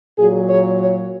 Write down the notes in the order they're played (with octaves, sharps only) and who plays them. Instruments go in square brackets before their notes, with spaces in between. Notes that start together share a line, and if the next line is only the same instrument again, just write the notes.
[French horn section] A#2 F#3 G#4
C#5
C#5